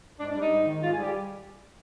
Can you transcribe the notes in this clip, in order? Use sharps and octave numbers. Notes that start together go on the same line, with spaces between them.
G#2 D4
D4
G3
D#4
G#2
D#3
G#2 F4
G#4
G3
G4